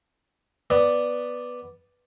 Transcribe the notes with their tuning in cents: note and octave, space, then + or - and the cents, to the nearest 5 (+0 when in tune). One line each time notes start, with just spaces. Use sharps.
B3 +0 D5 +0